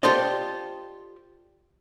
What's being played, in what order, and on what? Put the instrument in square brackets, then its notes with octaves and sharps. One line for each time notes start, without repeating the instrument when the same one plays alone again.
[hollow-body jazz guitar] F4 G4 A4 C5 D5 D#5